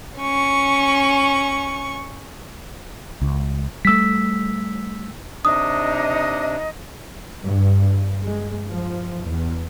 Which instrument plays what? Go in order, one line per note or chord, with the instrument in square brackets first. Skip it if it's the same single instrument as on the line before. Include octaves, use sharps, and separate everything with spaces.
[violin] C#4 C#6
[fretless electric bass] C#2
[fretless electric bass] G3 A3 [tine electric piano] E6 B6
[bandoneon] C3 D4 [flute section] D#4 D#5 [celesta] D#6
[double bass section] G2
G#3
F3
E2